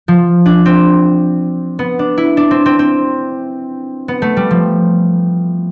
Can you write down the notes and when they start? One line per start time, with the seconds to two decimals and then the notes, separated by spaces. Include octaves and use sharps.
0.08 F3
0.46 D4
0.66 C4
1.79 B3
1.99 D4
2.18 E4
2.37 D4
2.51 C4
2.66 C4
2.79 C4
4.08 B3
4.22 A3
4.37 G3
4.51 F3